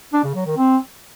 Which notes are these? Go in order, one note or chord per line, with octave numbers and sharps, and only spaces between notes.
D4
C#3
F#3
D#3
C4